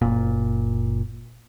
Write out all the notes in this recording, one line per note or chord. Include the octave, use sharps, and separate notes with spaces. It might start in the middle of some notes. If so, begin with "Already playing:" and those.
F#1 A#2